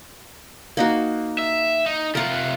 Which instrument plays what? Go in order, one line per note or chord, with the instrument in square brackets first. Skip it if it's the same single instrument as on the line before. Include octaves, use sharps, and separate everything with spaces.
[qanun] A#3 D#4 F#4
[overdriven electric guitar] E5
D#4
[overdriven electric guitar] C3 F4 [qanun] A#4 F#5